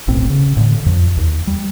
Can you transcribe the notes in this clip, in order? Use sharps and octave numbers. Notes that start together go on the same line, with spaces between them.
D#1 B1 A2 C4
C#3
A2 D3
F2
D#2
G3